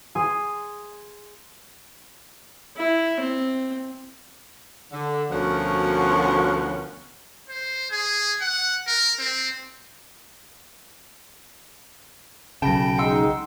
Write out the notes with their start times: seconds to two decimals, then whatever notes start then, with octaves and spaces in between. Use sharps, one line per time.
0.15 G#4 G#5 C6 D#6
2.77 E4
3.20 C4
4.92 D3
5.30 D2 B2 F3 C#4 A#4 F#5
7.49 C5
7.91 G#4
8.41 F#5
8.87 A#4
9.19 C4
12.62 B1 C#3 G5 A5 B5 A#6
12.98 G#3 D#4 F#5 C6 E6